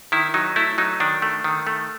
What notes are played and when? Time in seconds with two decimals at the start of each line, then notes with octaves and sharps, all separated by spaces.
0.12 D#3 E4
0.34 F#3 D#4
0.56 A3 E4
0.78 F#3 D#4
1.00 D#3 D4
1.22 A3
1.44 D#3
1.67 A3